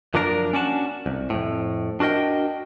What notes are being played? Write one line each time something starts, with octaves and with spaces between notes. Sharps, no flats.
F#2 F3 A#3 D4 A#4
C#4 D4 F#4 A5
C2
F2 A2
D4 F#4 A#4 D#5 G5